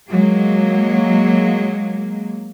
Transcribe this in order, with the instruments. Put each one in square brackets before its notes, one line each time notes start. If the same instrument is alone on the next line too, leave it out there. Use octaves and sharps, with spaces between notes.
[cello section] F#3 G#3 A#3